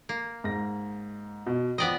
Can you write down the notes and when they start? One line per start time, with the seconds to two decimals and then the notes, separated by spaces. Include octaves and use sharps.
0.09 A#3
0.44 G#2 A#6
1.46 B2
1.78 F3 B3 D5 D#5 G5 D#6